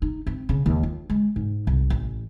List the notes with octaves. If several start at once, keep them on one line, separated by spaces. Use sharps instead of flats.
D#4
C4
C#3
D#2
F4
G#3
G#2
C2
A1